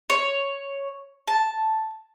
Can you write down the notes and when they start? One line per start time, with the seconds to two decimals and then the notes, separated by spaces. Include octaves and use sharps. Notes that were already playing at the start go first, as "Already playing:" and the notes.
0.10 C#5
1.28 A5